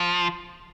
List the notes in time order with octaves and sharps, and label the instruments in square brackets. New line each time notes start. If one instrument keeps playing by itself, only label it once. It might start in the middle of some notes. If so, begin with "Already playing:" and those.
Already playing: [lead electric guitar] F3